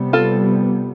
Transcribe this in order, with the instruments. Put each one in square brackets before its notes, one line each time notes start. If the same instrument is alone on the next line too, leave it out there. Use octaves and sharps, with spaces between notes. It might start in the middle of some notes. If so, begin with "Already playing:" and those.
Already playing: [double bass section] C3 G3 B3
[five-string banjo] F4 A4